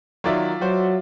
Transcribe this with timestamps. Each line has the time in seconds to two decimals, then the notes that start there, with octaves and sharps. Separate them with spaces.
0.24 D#3 F#3 F4 D5 E5
0.61 F#3 F#4 C5